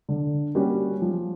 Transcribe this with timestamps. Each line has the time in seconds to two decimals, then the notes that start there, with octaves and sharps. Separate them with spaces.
0.09 D3
0.55 G3 A#3 C#4 F#4
1.02 F3